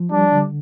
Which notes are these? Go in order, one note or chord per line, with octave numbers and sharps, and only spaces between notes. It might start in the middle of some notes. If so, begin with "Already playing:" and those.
Already playing: F3
G3 D4
D3